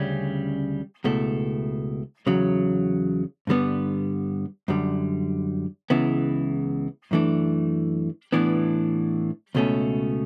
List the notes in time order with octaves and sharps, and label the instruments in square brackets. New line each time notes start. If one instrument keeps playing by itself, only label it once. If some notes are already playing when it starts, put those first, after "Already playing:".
Already playing: [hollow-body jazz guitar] D2 C#3 G3 C#4
C#2 B2 A3 E4
E2 C#3 F#3
G2 D3 G3 B3
F#2 D3 G3
C#2 C#3 E3 B3 E4
F#2 E3 A3 D4
A2 E3 B3 D4
C#2 B2 A3 C#4